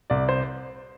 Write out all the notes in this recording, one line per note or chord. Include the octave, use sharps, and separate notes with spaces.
C2 D5
C5